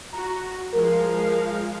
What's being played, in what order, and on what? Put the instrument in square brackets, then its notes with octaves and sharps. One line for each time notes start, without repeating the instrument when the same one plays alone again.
[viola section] F#4 [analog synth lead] A#5
[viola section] F3 G#3 F5 [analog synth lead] A#4